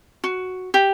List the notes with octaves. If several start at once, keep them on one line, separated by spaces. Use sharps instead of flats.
F#4
G4